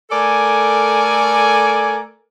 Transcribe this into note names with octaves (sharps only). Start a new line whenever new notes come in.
A3 A4 A#4 D5 G#5